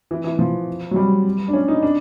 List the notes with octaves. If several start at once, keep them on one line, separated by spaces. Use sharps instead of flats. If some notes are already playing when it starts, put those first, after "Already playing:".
E3
E3
F3
F#3
G3
D4
C#4
D#4
D4